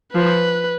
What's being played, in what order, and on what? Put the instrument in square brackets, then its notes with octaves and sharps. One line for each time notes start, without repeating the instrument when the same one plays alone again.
[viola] F3 [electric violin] B4